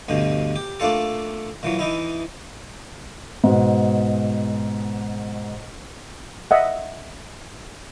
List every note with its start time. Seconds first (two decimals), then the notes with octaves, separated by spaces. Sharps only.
0.09 D2 G2 B2
0.56 G4
0.80 A3 A#3 D4 F4 A4
1.63 A#2 E3 F#3
1.79 E3 D#4 E4
3.44 G#2 B2
6.51 D#5 E5 F#5